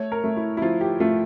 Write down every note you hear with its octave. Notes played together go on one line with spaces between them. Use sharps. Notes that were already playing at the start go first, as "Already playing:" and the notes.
Already playing: A3 C#5
A#4
A3
E4
E4
F3 F4
G4
A3 F4